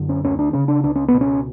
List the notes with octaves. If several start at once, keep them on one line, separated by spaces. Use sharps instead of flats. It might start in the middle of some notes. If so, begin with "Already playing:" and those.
Already playing: F#2 D3
C#4
D2 C#4
D4
C#3 C#4
D4
C#2 D4
C#4
B3
B2
C#4